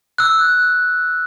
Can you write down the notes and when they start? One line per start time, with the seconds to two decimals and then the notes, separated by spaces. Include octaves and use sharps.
0.18 E6 F#6